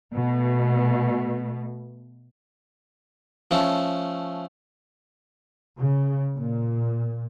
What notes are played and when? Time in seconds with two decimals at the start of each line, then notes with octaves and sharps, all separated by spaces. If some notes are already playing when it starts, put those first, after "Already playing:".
0.13 B2 A3
3.51 F3 A3 C#4
5.79 C#3
6.37 A#2